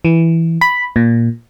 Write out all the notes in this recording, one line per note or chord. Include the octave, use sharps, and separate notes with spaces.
E3
B5
A#2